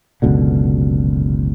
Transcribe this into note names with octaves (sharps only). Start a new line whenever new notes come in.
F#1 C#2 B2 D3